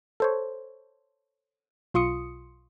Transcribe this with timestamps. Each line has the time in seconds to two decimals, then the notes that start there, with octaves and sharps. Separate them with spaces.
0.20 A4 C5 C#5
1.94 B1 F4 C6 C#6 D#6 C#7